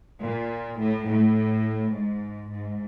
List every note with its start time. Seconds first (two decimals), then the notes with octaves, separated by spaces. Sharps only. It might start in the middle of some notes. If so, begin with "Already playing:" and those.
0.20 A#2
0.78 A2
1.06 A2
1.93 G#2
2.51 G#2